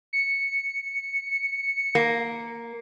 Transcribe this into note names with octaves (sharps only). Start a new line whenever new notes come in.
C#7
A#3